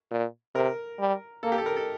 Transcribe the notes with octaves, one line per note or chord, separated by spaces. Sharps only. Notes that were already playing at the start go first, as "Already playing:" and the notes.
A#2
C3 A#4
G3
A#3 A4
G4
A4
A#4
A4